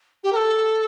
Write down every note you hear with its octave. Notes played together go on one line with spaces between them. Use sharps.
G4
A#4
A4